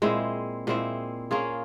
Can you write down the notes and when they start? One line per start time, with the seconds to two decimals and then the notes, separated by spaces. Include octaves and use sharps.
0.02 A#2 G#3 C4 E4
0.67 A#2 G#3 C4 E4
1.31 A#3 C#4 F4 G#4